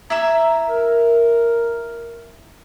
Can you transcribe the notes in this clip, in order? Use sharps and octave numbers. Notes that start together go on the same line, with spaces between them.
E4 E5 A#5 E6
A#4